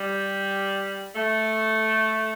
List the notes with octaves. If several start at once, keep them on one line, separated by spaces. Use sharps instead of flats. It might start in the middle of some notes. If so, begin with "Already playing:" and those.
Already playing: G3
A3